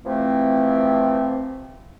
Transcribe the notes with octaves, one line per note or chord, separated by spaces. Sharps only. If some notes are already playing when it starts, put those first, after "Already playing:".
C3 E3 F3 A3 C4